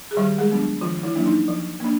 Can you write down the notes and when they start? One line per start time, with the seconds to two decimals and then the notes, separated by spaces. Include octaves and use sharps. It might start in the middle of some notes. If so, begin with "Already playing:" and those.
0.11 G#4
0.16 D#3 G3 G4
0.38 G#3 G#4
0.50 F#3 B3 D4
0.81 D#3 F3 F4
1.03 E3 E4
1.15 F#3 A#3 D4
1.26 D#4
1.48 F3
1.80 A#3 D4